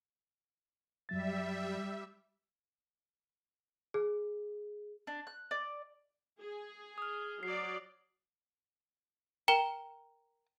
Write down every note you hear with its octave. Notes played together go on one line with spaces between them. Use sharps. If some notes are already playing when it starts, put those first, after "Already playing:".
F#2 F#3 G3 E5 A6
G#4
D4
F#6
D5
G#4
D#6 F6
F#3 D5 C7
A#4 G5 E7 G7